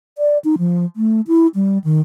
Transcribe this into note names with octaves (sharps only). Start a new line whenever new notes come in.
D5
D#4
F3
A3
E4
G3
D#3